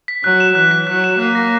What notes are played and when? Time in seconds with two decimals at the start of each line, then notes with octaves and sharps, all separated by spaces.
0.08 B6
0.23 F#3 F#6
0.40 E7
0.55 E3 F#6
0.71 B6
0.87 F#3 F#6
1.04 E7
1.19 A#3 F#6
1.35 A#6